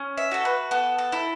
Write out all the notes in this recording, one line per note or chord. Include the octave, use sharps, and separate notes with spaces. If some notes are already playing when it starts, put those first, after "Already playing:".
Already playing: C#4
E5
F#4 A4
B4
B3 A4
A4
E4 A4